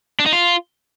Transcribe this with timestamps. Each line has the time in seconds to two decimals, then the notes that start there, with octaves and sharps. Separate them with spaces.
0.19 D4
0.26 D#4
0.33 F4